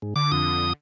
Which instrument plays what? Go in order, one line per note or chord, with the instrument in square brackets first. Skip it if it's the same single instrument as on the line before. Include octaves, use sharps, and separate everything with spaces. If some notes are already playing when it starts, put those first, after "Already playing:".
[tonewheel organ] G#2
[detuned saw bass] D3 [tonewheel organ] D6
[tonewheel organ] F2 D#6